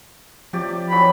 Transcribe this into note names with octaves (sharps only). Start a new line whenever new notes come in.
C3 F3 G4 D5
D#3 E3 F#3 B5